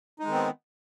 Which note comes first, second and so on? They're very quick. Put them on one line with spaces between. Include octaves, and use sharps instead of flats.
D#4 G#3 D#3 C4 B3